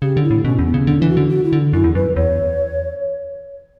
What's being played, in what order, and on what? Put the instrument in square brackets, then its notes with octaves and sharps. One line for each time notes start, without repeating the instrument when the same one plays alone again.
[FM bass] C#3 [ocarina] G4
[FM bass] D3
[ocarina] E4
[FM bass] A2
[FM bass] B2 [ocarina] C#4
[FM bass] E2 [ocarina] C#4
[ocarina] B3
[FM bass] C#3
[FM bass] D3 [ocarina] D4
[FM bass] E3 [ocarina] E4
[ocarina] F#4
[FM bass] D3
[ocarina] F#4
E4
[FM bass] D3
[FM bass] F#2 [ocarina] E4
[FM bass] E2
[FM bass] F#2 [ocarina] B4
[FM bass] E2 [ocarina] C#5